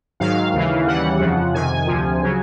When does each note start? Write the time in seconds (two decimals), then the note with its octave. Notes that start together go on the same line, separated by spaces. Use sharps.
0.20 G#2 D#3 F#3 F5
0.54 D#2 C#3 E3
0.87 D#2 C#3 E3 G3 F#5
1.20 F2 C#3 F3
1.54 F2 C3 D#3 G#5
1.87 D2 C3 F3
2.22 C#3 F#3